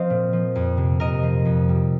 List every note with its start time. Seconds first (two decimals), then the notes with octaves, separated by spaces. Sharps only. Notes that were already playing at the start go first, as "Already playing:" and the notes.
Already playing: F3 C4 C5 D#5 F5
0.10 A#2
0.33 F3
0.56 F2
0.77 C3
1.00 F2 A#4 D#5
1.23 F3
1.45 F2
1.69 G3